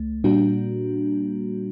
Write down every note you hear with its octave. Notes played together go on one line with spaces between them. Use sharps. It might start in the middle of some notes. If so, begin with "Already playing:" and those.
Already playing: C#2 A3
A#2 G3 A#3 D4 F#4